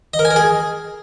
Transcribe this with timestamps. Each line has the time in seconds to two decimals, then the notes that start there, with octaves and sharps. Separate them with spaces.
0.14 D#5
0.19 A#4
0.25 G#5
0.31 A#4
0.36 G#4